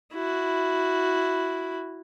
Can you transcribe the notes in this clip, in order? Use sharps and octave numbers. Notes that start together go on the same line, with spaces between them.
E4 F#4